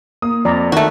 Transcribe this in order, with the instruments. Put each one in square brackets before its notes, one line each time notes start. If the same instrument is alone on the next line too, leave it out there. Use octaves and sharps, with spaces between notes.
[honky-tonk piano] A#3 [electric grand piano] D#6
[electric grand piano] F2 [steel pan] D5 A#5
[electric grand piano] D#3 [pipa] A3 F#4